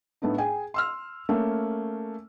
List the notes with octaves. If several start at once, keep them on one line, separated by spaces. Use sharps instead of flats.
A2 A3 B3 D4 D#4
G#4 G5 G#5
C6 E6 F6
A3 A#3 C#4